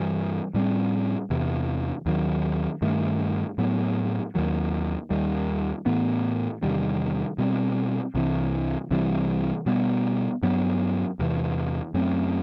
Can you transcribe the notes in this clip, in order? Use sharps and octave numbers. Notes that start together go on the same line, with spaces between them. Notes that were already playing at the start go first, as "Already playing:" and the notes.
Already playing: G2 E3 G3
A2 G3 C4
E2 C3 E3
D#2 D#3 F#3
G2 D#3 A3
A2 F#3 B3
D#2 D#3 F#3
D#2 D#3 G3
A2 E3 B3
E2 C3 D#3 G3
B2 G3 C4
C2 C3 E3
C2 C3 E3 G3
B2 G3 B3
G2 F#3 B3
E2 C3 E3
F#2 F#3 A3 C4